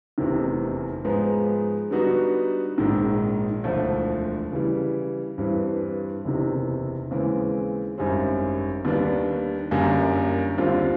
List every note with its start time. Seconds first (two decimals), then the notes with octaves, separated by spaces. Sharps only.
0.18 F1 E2 C3 D#3
1.04 G#2 F3 G#3 B3 D#4
1.91 D3 G3 B3 D#4 F#4
2.78 A#1 G#2 D#3
3.64 E1 D2 D3 F3 A3
4.51 C#3 E3 G3
5.38 G2 E3 G3 C4
6.25 F#1 E2 C3 D#3
7.11 D#2 C#3 E3 G#3 C4
7.98 G#1 F#2 D3 G3 C4
8.85 D#2 D#3 G3 B3 D4
9.71 G1 F#2 D3 G3 A#3
10.58 D#2 D3 G3 C4 F4